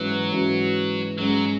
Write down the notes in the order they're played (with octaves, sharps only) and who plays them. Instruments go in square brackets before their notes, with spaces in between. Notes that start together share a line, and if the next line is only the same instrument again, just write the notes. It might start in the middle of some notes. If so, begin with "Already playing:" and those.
Already playing: [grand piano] G#2 E3 C#4 F#4 [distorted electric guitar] F#3
[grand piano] G#2 E3 C#4 F#4
[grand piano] G#2 G#3 C#4 [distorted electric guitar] F#3